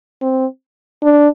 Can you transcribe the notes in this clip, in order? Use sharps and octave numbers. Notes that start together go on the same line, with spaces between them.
C4
D4